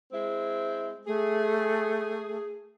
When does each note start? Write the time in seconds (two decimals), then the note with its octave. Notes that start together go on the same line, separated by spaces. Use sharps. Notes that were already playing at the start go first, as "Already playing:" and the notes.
0.12 G#3 C4 E4
1.07 A3 G#4